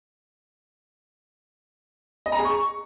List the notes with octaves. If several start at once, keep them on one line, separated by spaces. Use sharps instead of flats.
D#5
A#5
G#4
C#6